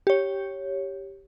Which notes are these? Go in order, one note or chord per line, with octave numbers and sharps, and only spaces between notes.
G4 C#5